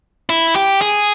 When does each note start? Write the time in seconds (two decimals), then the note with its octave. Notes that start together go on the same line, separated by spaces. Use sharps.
0.30 E4
0.56 G4
0.81 G#4